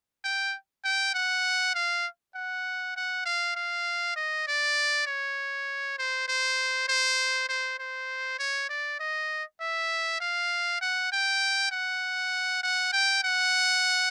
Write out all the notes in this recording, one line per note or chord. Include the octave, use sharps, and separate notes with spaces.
G5
G5
F#5
F5
F#5
F#5
F5
F5
D#5
D5
C#5
C5
C5
C5
C5
C5
C#5
D5
D#5
E5
F5
F#5
G5
F#5
F#5
G5
F#5